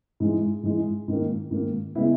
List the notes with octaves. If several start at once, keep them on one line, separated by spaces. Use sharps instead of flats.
G#2 E3 G#3
G#2 E3 G#3
G#2 D#3 A#3
G#2 D#3 A#3
C#3 G#3 B3 E4